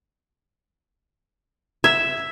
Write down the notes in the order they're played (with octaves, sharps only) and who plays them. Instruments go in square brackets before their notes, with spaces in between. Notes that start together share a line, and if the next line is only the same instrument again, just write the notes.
[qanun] E5 [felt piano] G#6 E7